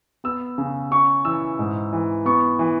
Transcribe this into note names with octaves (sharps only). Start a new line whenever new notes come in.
B3 E6
C#3
C#4 C#6
E3 E6
G#2
E3
B3 C#6
E3